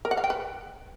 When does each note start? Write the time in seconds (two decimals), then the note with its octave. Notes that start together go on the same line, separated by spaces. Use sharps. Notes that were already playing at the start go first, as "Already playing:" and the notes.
0.05 A#4
0.11 F#5
0.17 F5
0.24 G5
0.30 B4